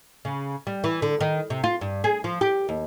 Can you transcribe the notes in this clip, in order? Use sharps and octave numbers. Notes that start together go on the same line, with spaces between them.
C#3
G3
E3
D3
D#3
C3
F4
G2
G#4
F3
G4
D#2